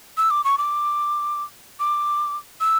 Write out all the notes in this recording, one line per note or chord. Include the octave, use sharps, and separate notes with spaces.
E6
D6
C#6
D6
D6
E6